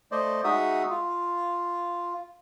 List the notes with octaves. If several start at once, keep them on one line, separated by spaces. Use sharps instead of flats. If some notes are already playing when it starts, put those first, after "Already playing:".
A3 C5 D5 D#5
G#3 D#4 F#4 E5 D#6
F4